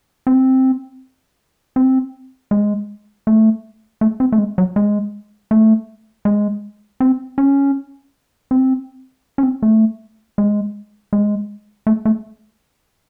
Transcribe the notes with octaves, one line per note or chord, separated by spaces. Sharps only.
C4
C4
G#3
A3
A3
C4
A3
G#3
F#3
G#3
A3
G#3
C4
C#4
C4
C#4
C4
A3
G#3
G#3
A3
A3